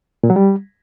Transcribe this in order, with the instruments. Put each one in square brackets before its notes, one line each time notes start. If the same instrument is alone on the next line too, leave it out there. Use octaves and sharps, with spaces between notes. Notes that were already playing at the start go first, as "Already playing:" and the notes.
[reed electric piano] A#2
F#3
G3